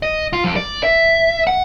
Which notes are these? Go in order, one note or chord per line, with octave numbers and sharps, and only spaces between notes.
D#5
F4
F2
D5
E5
F#5